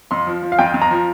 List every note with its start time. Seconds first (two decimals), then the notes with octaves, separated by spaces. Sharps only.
0.11 F2 C6
0.27 F3
0.43 F3
0.52 F5
0.59 F2 G5
0.74 F2
0.82 A#5
0.91 F3